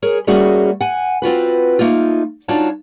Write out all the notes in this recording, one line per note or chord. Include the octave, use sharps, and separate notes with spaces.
G#4 A#4 C#5
G3 A3 A#3 C#4 F#4 G#4
F#5 G#5
C4 F4 F#4 B4
A3 A#3 D#4 F4
D4 D#4 F4 F#4 C#5 A5